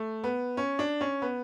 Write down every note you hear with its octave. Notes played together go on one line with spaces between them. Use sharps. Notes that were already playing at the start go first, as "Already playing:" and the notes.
Already playing: A3
B3
C#4
D4
C#4
B3